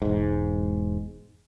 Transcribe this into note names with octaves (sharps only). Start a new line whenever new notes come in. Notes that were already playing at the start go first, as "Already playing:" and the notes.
E1 G#2